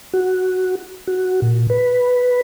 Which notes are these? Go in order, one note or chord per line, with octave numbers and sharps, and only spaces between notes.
F#4
F#4
A#2
B4